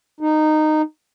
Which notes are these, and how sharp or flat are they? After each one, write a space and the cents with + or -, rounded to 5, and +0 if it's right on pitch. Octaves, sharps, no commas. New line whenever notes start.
D#4 -15